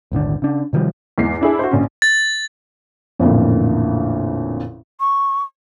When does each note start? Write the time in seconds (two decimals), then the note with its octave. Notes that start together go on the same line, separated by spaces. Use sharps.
0.12 D#1 G#1 D3 D4
0.42 C#3 D4
0.73 C3 D#3 F3 G3
1.18 E2 G#2 C7
1.41 D4 E4 G#4
1.59 F#4 C5
1.71 A#1 C#4
2.02 A6
3.19 A1 F2 A#2 D3
5.00 C#6